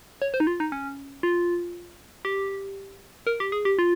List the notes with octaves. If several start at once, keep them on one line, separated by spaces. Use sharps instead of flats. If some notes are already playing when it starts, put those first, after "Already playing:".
C#5
C5
D#4
F4
D#4
C#4
F4
G4
A#4
G4
G#4
G4
F4